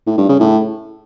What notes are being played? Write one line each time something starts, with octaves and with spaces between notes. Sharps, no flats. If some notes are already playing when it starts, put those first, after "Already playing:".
A2
G2
C#3
A2